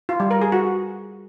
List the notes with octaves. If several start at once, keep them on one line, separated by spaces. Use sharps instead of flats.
F4
G3
A#4
G#4
F#4